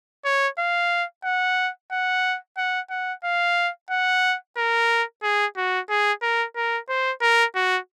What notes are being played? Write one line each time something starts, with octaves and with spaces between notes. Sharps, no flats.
C#5
F5
F#5
F#5
F#5
F#5
F5
F#5
A#4
G#4
F#4
G#4
A#4
A#4
C5
A#4
F#4